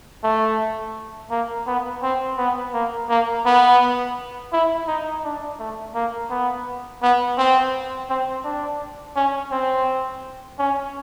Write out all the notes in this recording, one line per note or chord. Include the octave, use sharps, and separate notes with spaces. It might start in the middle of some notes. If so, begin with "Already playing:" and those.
A3
A#3
B3
C4
B3
A#3
A#3
B3
E4
D#4
D4
A3
A#3
B3
B3
C4
C4
D4
C#4
C4
C#4